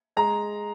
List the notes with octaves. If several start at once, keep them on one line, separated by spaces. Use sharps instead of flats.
G#3 A#5